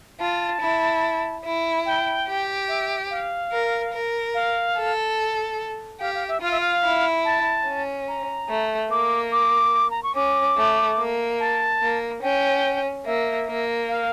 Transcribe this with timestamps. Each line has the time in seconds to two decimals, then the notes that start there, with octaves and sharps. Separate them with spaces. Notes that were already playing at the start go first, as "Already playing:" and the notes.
0.20 F4 A5
0.61 E4
1.45 E4
1.86 G5
2.28 G4
2.68 E5
3.11 F5
3.52 A#4
3.93 A#4
4.34 F5
4.77 A4
6.01 G4 F5
6.14 F5
6.28 E5
6.42 F4 F5
6.51 E5
6.60 F5
6.84 E4
7.25 A5
7.66 C#4
8.08 A#5
8.49 A3
8.91 A#3 D6
9.32 D6
9.91 A#5
10.03 C#6
10.15 C#4 D6
10.56 A3
10.98 A#3
11.40 A5
11.82 A#3
12.22 C#4 G5
13.05 A#3 E5
13.47 A#3
13.89 F5